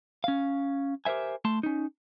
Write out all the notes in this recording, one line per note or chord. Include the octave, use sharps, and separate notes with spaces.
C#4 F5
G4 A#4 C5 E5 G#5
A3 A5 C6
C#4 D#4